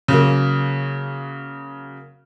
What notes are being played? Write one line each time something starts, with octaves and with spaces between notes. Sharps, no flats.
C#3 F#3 A#3